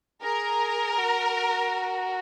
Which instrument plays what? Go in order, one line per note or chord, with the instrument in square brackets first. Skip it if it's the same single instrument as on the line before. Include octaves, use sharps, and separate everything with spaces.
[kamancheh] G#4 [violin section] A#4
[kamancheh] F#4